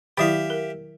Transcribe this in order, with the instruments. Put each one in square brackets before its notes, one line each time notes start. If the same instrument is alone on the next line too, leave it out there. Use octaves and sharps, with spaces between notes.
[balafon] D#3 F#3 E4 [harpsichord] G4 E5 F5
[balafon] A#4